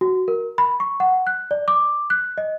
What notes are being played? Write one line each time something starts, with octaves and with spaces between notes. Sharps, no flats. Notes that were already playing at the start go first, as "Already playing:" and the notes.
F#4
A#4
B5
C#6
F#5
F#6
D5
D6
F#6
D#5